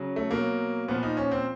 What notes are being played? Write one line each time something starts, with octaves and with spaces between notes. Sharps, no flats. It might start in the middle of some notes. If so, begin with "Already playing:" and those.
Already playing: C#3 F#3
A3
B2 F#3 A#3
A#2 F3 B3
D#4
C#4
C4